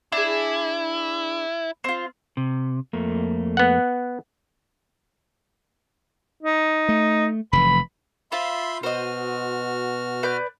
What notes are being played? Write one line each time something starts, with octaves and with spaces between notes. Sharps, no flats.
D4 E4 G#4
C4 F4
C3
F2 A3 A#3
B3 F#5
D#4
A3
F1 E3 B5
F4 C5 E5 B5 C6
B2 F#4 C5 D#5 F6
B4 D5 G6